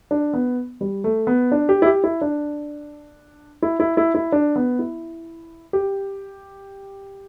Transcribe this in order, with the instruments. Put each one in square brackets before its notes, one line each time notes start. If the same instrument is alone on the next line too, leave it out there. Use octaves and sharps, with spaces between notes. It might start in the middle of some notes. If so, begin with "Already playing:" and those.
[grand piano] D4
B3
G3
A3
B3
D4
G4
E4
G4
E4
D4
E4
E4
E4
E4
D4
B3
E4
G4